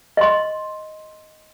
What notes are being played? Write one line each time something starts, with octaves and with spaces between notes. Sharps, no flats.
D#5 C6